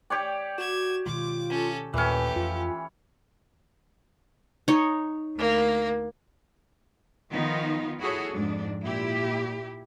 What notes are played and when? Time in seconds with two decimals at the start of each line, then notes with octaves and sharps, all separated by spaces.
0.10 G4 C#5 D5 G5
0.58 F#4 G#6 E7
1.06 B2 D#3 G#3 F4 D6
1.51 C#4 A4
1.94 D#2 A#2 E3 A3 C#4 G4
2.36 F2 F4
4.68 D#4 C#5
5.35 D2 A#3
7.30 D#3 F3 B3 D#4 F4
8.00 E4 F#4 G#4 A4 C#5
8.32 F2 G#2 D4
8.84 A#2 E4 G4